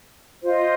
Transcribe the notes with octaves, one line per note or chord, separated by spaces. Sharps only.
F4 C5 D#5